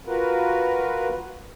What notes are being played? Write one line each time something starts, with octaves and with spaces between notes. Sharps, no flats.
F4 F#4 A#4 B4